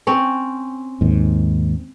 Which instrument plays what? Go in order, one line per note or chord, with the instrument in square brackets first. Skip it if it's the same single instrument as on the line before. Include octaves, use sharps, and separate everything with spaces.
[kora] C4 C#4 C#5
[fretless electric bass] D#2 G#2